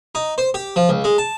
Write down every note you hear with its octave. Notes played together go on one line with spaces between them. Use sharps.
D#4
C5
G4
F3
C#2
G#3
A5